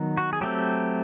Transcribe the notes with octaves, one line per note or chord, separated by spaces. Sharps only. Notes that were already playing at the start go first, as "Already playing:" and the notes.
Already playing: D#3 F#3 B3
F#4
G#4
F#3 A3 C4 G4